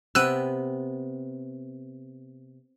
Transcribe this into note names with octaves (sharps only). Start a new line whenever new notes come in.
C3 B3 G5 E6 F#6 D#7